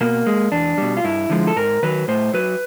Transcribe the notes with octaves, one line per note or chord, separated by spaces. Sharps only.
B2 A#3
G#3
E2 D4
B2 G3
F4
G2 E4
D3 F3 G#3
A4
G#2 A#4
D#3 F#3 B4
A2 C5
F#3 B4